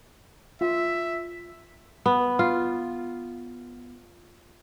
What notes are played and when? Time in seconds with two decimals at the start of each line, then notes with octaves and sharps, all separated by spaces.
0.61 F4 E5
2.06 B3
2.39 F4